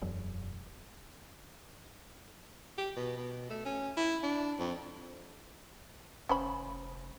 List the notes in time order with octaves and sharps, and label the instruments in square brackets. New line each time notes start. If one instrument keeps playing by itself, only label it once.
[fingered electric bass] E1 F#2
[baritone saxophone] G4
B2
B2
A3
C#4
E4
D4
F2
[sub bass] F1 [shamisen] C#4 C5 B5